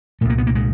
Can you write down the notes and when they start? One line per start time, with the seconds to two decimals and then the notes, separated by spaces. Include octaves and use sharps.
0.21 C2 A#2 A3
0.30 A#3
0.38 B3
0.47 A#3
0.55 G#3